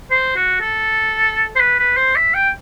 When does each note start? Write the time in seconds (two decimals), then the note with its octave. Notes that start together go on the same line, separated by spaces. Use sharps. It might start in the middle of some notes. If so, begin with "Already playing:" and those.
0.11 C5
0.36 F#4
0.61 A4
1.56 C5
1.60 B4
1.79 B4
1.97 C5
2.16 E5
2.34 G5